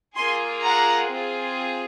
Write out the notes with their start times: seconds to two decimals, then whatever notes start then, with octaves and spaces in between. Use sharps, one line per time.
0.16 A#3 F4 G#4 G#5 C6
0.63 F#5 A#5
1.12 C4 F4 G#4